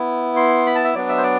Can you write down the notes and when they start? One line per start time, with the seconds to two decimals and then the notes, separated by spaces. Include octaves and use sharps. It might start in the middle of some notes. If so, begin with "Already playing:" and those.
Already playing: B3 E4
0.36 C6
0.66 B5
0.75 A5
0.84 E5
0.94 F#3 B3 D4 D5
1.09 E5
1.18 C5
1.23 D5